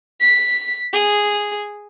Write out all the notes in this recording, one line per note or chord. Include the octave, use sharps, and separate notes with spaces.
B6
G#4